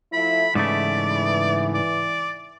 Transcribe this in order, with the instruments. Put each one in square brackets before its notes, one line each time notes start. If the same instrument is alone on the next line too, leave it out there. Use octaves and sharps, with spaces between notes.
[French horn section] F3 A3 E4 [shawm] B5
[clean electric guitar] G#2 C#3 A3 [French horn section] E3 [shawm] D5
[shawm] D5